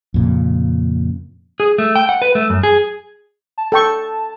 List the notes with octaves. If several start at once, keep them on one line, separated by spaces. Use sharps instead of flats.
F2 A#2 C#3
G#4
A3
G5
F#5
B4
A3
F#2
G#4
A5
A4 G5 C#6